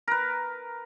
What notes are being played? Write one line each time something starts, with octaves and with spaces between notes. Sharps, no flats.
A#4 B4